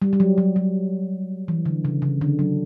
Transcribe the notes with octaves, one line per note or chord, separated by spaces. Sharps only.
G3
G3
F#3
F#3
F#3
E3
D3
C#3
C#3
D3
F#3